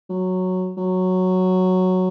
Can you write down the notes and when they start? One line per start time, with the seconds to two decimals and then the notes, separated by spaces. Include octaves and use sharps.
0.09 F#3
0.77 F#3